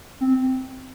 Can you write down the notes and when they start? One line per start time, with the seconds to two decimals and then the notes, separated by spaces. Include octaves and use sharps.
0.21 C4